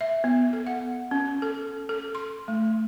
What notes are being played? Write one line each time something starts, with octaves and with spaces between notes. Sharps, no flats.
E5
B3
A4
F#5
C#4
A4
A4
C6
A3